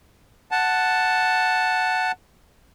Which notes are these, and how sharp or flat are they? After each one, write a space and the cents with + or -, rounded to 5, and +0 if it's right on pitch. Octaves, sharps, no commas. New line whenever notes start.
F#5 +0 A5 +0